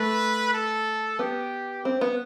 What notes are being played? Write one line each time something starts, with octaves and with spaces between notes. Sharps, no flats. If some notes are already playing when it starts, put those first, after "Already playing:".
Already playing: A3 B4
A4
B3 G4
C4
B3